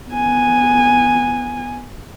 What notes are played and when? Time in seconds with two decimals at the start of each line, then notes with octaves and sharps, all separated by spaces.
0.10 B3 G#5